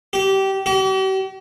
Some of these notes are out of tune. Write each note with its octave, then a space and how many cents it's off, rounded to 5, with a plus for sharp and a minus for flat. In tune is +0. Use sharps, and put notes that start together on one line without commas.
G4 -20
G4 -45